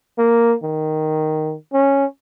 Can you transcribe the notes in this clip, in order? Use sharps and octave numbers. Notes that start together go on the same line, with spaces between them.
A#3
D#3
C#4